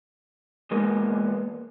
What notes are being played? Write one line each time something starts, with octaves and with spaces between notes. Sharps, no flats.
E2 G#3 A#3 B3